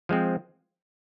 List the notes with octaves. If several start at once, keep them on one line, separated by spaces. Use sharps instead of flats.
F3 G#3 C4